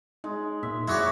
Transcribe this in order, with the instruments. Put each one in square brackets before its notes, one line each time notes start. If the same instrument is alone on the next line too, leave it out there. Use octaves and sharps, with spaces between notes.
[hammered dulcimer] G#3 [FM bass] D#4
[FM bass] A#2 [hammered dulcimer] E5
[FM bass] F#2 [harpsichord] E4 C#5 D5 [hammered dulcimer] F#4 G#4